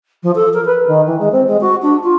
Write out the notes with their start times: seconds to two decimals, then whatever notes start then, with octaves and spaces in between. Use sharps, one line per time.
0.23 F3
0.35 A4
0.54 A#4
0.65 B4
0.87 D#3
1.06 E3
1.19 G#3
1.32 C4
1.47 G#3
1.61 F#4
1.82 D4
2.03 F4